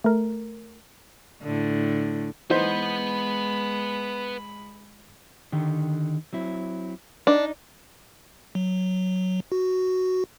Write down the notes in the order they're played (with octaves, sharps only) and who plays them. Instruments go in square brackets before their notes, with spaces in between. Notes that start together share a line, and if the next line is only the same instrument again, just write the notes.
[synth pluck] A3 A#4
[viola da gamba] A2 D3
[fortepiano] E3 D#4 C5 [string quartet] G#3 B5 [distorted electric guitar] B4 F#5
[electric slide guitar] D3 D#3 G4
F#3 C4 E4
[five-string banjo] D4 [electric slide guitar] D#4
[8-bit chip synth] F#3
F#4